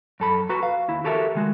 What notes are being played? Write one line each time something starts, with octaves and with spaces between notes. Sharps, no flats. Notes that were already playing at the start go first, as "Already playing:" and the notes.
F#2 A4 B5
F#4 B4 A#5
F5
D#2 E4
F#4 G4 A4 A#4 D#5 E5
D#3 G#3 F#4